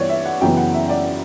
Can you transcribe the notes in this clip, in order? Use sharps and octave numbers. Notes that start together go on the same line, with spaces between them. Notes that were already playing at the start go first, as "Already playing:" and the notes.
Already playing: G2 E3 B3 C#5 D5
E5
F#5
F#2 C#3 E3 B3 G5
F#5
E5
D5